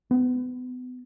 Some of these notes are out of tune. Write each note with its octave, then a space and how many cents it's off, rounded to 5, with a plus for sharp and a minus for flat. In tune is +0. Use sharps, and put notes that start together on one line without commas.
B3 +30